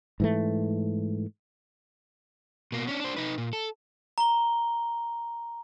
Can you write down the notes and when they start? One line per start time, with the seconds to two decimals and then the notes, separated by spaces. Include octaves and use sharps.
0.20 G#2 E3 A3
2.72 B2 A#3
2.87 C#4 D4
3.00 D4 C5
3.17 D#4 B4
3.38 A#2
3.53 A4
4.18 A#5 G7